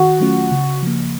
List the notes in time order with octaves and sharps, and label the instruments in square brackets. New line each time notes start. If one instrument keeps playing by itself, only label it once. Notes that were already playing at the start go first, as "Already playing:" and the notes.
Already playing: [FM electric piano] D#3 [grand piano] F#4
[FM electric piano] F#3 A3 C#4 F4
C#3
F3 A#3